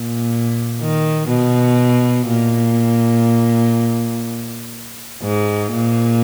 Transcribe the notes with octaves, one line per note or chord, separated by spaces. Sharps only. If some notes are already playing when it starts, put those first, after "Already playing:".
Already playing: A#2
D#3
B2
A#2
G#2
A#2